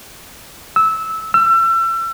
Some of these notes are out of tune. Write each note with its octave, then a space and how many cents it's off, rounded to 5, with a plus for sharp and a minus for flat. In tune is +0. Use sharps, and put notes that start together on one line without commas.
E6 -15
E6 +35